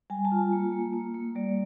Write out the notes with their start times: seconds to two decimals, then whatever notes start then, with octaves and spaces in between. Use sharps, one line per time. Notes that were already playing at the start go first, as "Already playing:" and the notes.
0.10 G3 G#5
0.25 A5
0.32 F4
0.53 A#3
0.72 A#3
0.93 A#3
1.14 A#3
1.35 G3 D5